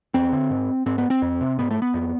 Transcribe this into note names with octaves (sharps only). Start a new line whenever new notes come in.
E2 C4
D3
G#2
G#2 C4
B3
C4
F2
C3
G#2 B3
A3
B3
F2